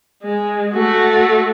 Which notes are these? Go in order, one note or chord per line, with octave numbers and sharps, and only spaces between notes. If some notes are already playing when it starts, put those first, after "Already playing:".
G#3
A3 F#4